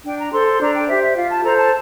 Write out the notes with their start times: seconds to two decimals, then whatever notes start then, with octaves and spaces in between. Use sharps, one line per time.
0.05 D4 G5
0.18 A#5
0.32 A4 C5 C6
0.47 C6
0.60 D4 A#5
0.74 G5
0.87 G4 C5 E5
1.02 E5
1.16 F4 F5
1.29 A5
1.43 A4 C5 A#5
1.57 A5